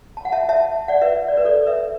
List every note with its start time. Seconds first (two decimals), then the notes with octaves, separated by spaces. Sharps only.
0.17 A5
0.25 F#5
0.32 E5 A5
0.49 E5 A5
0.88 D5 F#5
1.01 B4 E5
1.28 D5
1.37 B4
1.45 A4 D5
1.67 B4 E5